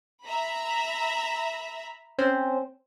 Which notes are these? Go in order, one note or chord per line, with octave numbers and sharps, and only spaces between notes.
E5 A#5 B5
C4 C#4 C5